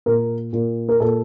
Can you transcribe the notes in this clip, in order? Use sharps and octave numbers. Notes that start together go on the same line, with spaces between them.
A#2 A#4
A#2
A#4
A#2 A4